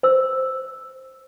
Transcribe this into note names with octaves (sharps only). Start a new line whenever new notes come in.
C5 E6